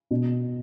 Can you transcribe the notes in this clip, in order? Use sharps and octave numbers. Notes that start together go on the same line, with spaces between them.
B2